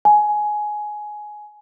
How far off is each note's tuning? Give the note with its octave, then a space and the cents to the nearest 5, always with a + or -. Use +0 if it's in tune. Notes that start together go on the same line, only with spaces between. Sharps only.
G#5 +15